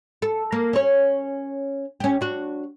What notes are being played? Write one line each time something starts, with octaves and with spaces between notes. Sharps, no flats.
A4
A#3
C#4 C#5
C#4 G4
D4 F#4